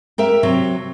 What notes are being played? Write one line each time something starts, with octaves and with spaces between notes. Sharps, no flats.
G4 A#4 E5
C3 F#3